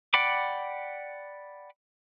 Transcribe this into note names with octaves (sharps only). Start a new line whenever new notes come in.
D5 F#5 G5 B5 D6